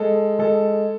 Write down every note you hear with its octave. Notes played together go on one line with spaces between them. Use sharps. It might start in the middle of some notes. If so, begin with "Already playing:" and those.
Already playing: G#3 A4
G#3 A4